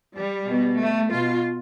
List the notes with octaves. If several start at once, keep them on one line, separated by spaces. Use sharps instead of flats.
G3
B2
A3
B2 F4